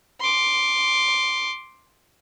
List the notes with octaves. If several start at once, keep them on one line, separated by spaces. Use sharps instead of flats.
C6 D6